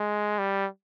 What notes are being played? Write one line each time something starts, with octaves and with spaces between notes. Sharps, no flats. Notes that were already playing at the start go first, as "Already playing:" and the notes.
Already playing: G#3
G3